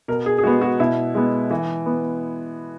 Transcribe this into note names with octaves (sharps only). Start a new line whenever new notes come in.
B2 A#4
G#4
G#4
G#3 B3 F#4
F#4
B2 E4
G#3 B3
E3
B3